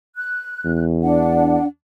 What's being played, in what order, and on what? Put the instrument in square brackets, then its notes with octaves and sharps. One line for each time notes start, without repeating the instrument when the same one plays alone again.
[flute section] F#6
[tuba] E2
[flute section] D4 F#5